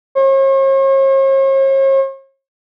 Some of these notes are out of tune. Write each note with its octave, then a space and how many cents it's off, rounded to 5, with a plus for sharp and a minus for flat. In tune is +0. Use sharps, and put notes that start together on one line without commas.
C#5 -45